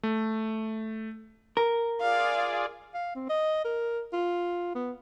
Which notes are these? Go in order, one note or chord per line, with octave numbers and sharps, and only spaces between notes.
A3
A#4
F4 G#4 D5 F5
F5
C4
D#5
A#4
F4
B3